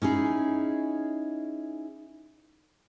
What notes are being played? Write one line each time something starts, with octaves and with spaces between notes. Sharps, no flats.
C#4 D#4 E4 G#4